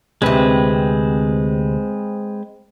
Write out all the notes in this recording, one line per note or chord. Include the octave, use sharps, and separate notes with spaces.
D2 C3 G#3 C4 B4